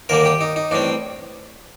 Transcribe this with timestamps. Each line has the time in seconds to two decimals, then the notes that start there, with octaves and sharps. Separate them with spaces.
0.09 D#2 D3 G3 A#3 A#4
0.25 G4
0.41 D#4
0.56 D#4
0.71 A1 A2 G3 C4 D4